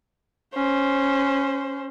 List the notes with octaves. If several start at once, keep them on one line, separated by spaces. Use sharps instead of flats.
C#4 C5